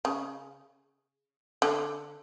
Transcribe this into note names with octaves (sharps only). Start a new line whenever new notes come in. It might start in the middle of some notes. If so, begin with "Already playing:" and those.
C#3
D3